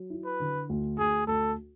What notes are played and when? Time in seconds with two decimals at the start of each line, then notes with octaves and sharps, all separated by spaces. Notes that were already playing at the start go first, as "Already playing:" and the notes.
Already playing: F#3
0.10 E4
0.25 B4
0.40 D3
0.69 D2
0.98 D2 G#4
1.27 D2 A4